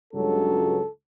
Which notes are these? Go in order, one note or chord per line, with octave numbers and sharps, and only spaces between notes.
C#2 G2 F#3 A4